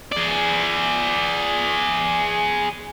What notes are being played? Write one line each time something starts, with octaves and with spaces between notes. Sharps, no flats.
G#4 D5